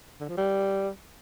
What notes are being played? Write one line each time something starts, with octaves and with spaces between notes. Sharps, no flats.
D3
F3
G3